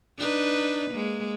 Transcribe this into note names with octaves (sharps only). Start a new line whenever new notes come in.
D4 D#4 B4
G#3 A#3